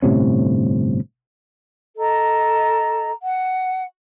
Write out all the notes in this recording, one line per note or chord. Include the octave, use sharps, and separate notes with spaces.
G1 A2 C3 C#4
A4 D#5 A#5
F#5